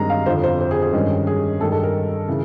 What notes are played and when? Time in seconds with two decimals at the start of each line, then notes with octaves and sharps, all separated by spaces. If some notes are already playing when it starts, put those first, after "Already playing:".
Already playing: G2 D#3 G#3 C4 A#5
0.10 F5
0.26 F2 D3 F3 C5
0.44 C5
0.61 C5
0.71 G#4
0.82 G#4
0.93 G2 D#3 G#3 C#4
1.27 G#4
1.60 G2 D#3 G#3 A4
1.72 A4
1.83 A#4
2.28 C#3 E3